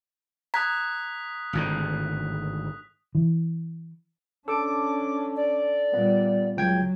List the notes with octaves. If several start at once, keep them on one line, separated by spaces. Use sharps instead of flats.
A#5 D#6 F#6 G#6 B6
G#1 A2 D3
E3
C#4 D4 A4 D6
D5
A#2 G3 B3
C#2 F#3 G5 G#6